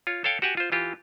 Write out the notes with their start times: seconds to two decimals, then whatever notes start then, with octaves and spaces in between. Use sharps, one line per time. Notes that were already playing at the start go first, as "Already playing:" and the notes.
0.07 F4 C#5
0.24 A4 C#5 F5 G5
0.42 F#4 G4 F#5 G#5
0.57 F4 C5
0.72 E3 F4 G4